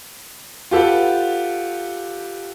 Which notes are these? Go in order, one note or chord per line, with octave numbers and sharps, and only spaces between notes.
F4 G4 A4 B4 F#5